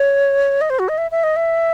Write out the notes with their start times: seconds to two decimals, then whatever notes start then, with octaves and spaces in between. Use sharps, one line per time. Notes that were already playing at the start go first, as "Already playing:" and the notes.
Already playing: C#5
0.61 D#5
0.70 C5
0.79 F#4
0.89 D#5
0.98 E5
1.11 E5
1.24 D#5
1.36 E5